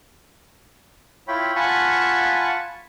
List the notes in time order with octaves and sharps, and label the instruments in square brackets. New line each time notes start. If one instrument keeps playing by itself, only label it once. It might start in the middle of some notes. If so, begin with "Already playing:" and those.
[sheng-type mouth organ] E4 F4 C#5 G5 B5
F4 F#5 G#5 A5 B5 C#6